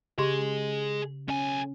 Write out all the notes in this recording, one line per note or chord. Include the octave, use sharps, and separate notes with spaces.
C#3 G4 G#4 D#5 C6
B1 C#4 G#5